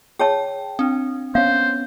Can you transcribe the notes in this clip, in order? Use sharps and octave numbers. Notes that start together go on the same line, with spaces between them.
G#4 C#5 G5 A5
C4 D4
B3 C#4 C5 F5